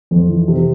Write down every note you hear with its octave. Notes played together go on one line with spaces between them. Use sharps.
F2
E3
C3